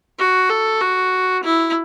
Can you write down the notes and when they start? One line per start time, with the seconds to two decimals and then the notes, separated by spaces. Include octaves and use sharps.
0.19 F#4
0.49 A4
0.81 F#4
1.44 E4